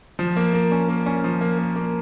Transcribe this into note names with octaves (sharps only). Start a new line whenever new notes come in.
F3
A#3
A#3
C#4
A#3
C#4
F3
A#3
A#3
A#3